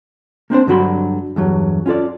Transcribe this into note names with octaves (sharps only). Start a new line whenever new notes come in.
A#3 C4 D4 C5
G2 D3 F#3 F#4 B5 C6
E2 G2 F#3
C#4 F4 A4 D5